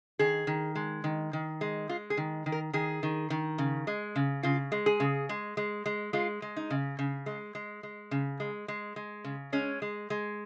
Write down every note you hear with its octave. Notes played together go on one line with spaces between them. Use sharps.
D#3 G#4
D#3
G#3
D#3
D#3
G#3
G#3 F4
G#4
D#3
D#3
A#4
D#3 G#4
D#3
D#3
C#3
G#3
C#3
C#3 F4
G#3
G#4
C#3
G#3
G#3
G#3
G#3 F4
G#3
D#4
C#3
C#3
G#3
G#3
G#3
C#3
G#3
G#3
G#3
C#3
G#3 C#4
G#3
G#3